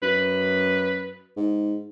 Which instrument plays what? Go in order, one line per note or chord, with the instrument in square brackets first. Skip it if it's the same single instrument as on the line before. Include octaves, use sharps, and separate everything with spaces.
[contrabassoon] F#2 [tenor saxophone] B4
[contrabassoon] G#2